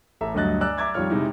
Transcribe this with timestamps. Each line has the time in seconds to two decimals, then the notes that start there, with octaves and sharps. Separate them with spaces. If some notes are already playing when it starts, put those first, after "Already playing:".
0.21 A1 A4 E5 A#5
0.34 D2 G2 F#3 D#5 F#6 A6
0.61 D5 G#5 A#5 E6 F#6
0.78 E5 A#5 D6 E6 G#6 A6
0.94 F2 D#3 G3 F4 C#5 F6
1.10 C3 G#3 D#4 E4